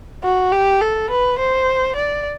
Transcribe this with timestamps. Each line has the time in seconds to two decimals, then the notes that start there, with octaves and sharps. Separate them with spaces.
0.24 F#4
0.52 G4
0.82 A4
1.10 B4
1.39 C5
1.96 D5